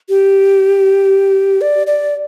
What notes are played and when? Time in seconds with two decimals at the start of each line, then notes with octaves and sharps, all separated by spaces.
0.09 G4
1.61 D5
1.87 D5